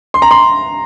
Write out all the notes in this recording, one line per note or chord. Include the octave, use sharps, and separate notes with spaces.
C6
A#5
C6